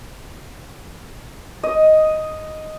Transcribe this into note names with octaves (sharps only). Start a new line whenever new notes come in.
D#5